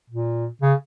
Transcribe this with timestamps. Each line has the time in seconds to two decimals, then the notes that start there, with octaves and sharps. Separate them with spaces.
0.10 A#2
0.61 C#3